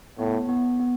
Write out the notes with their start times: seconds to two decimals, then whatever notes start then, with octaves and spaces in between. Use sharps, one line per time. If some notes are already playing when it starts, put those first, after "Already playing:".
0.19 A2 B3
0.49 B3
0.80 B3